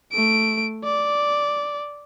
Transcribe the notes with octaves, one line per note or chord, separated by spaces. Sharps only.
A3 D7
D5